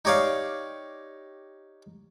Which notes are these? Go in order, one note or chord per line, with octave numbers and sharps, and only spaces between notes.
D#4 G4 C#5 D5 F5